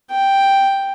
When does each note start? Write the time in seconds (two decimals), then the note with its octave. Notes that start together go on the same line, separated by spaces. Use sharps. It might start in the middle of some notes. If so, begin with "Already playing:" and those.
0.11 G5